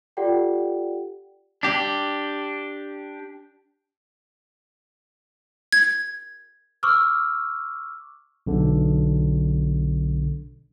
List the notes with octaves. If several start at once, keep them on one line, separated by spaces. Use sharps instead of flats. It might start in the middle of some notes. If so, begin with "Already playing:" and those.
F4 G4 A4 D5 F#5 G5
D4 G4
G#6
C#6 D6 E6 F6
B1 D3